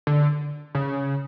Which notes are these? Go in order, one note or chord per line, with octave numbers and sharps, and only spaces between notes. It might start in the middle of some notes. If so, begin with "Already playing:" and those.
D3
C#3